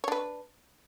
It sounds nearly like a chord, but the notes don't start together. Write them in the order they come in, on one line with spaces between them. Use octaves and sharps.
C#5 D4 B4